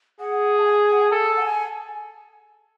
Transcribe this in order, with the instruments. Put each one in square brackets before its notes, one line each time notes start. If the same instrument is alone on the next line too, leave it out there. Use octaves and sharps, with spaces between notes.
[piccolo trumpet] G#4 [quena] F#5
[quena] A5
G#5
F#5
G#5
[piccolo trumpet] A4 [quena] A5
[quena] F#5
G#5